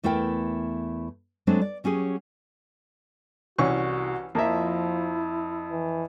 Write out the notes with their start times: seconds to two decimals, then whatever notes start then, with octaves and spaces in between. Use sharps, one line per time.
0.04 E2 A3 E4 A#4 G5
1.47 F#3 G#3 A3 C4 D4
1.61 D5
1.84 F#3 C#4 G4 G#4
3.58 C2 E3 C#4 F#4 C#6
4.35 F2 F3 A#3 E4 E5
5.72 E3